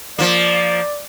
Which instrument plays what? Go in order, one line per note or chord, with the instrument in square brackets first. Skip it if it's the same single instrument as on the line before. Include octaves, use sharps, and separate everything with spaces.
[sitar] F3 A#3 [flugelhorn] D5